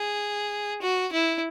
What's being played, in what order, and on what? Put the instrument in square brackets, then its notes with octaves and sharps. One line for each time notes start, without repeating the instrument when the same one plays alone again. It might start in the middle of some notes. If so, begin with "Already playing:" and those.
Already playing: [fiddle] G#4
F#4
E4